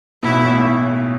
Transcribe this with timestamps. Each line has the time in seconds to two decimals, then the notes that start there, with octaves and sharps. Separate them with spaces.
0.23 B1 B2 E4
0.33 A1 A2
0.43 B1 B2
0.53 A1 A2